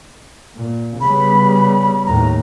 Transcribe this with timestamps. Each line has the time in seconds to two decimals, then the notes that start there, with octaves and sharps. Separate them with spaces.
0.57 A#2
1.01 C#3 G3 B3 B5
2.06 D#2 A2 A#5